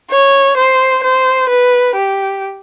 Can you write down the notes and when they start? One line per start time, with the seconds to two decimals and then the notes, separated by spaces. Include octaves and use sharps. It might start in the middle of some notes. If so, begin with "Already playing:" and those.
0.11 C#5
0.57 C5
1.04 C5
1.49 B4
1.95 G4